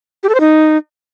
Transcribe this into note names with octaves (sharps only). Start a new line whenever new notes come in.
G4
A4
C5
D#4